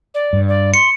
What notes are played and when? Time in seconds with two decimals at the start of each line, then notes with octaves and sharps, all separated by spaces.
0.14 D5
0.33 G2
0.48 D5
0.74 C6 C#7